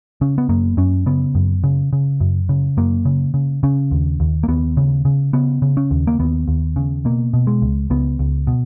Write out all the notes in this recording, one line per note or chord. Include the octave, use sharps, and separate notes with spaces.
C#3 C#4
B3
F#2 A#3
F#2 C#4
C#3 B3
F#2
C#3
C#3
F#2
C#3
F#2 A#3
C#3
C#3
C#3 C#4
D#2
D#2
A#3
D#2 B3
C#3
C#3
C#3 B3
C#3
C#4
D#2
A#3
D#2 B3
D#2
C#3
B2 A#3
B2
G#3
C#2
C#2 B3
C#2
B2